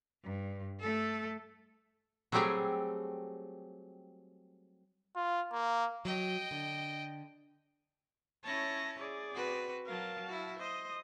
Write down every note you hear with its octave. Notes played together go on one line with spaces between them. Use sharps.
G2
A3 A4
F#3 G3 A3 C4 G4 G#4
F4
A#3
F#3 D#5 G5
D3
C#4 E4 C#5 A5 A#6
G#4 D5
C4 F#4 B4
F#3 A#4 F5 A5
E4 F#4
C5 D#5 D#6